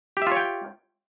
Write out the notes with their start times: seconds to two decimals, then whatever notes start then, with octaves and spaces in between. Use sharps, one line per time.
0.17 G4
0.22 E5
0.27 F4
0.32 C#5
0.37 G5